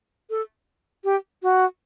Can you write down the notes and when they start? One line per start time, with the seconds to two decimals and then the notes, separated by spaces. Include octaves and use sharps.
0.30 A4
1.04 G4
1.43 F#4